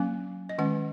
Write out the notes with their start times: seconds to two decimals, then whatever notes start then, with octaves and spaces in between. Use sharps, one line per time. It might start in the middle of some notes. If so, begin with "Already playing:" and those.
Already playing: F#3 A#3 C#4 G#5
0.49 D#5
0.58 D#3 G#3 C#4 F#5